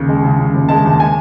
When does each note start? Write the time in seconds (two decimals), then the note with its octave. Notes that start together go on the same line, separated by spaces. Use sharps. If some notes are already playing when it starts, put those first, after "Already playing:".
Already playing: D#2 C#3
0.09 G#3
0.24 C#3
0.39 C#3
0.54 D#2
0.69 G#3 A5
0.84 D#2
1.00 G#5